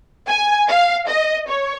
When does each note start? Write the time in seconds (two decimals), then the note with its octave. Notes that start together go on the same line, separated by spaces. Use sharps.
0.27 G#5
0.68 F5
1.08 D#5
1.48 C#5